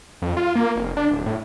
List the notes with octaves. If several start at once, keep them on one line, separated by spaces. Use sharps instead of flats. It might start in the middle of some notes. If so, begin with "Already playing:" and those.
F2
F4
A#3
F1
D4
D1
A2